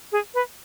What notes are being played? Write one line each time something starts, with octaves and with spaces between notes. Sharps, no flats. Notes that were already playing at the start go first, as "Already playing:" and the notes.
G#4
B4